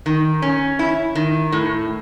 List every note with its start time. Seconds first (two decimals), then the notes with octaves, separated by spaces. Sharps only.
0.06 D#3
0.42 C#4
0.79 E4
1.15 D#3
1.52 A2